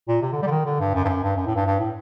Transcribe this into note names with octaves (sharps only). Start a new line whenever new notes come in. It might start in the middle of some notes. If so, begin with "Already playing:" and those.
A#2
C3
D3
G3
D3
D#3
D3
G2
F#2
G2
F#2
G2
F#2
A2
G2
G2
A2